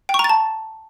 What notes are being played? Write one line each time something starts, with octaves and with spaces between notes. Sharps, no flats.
G5
C#6
A#5
A6
A5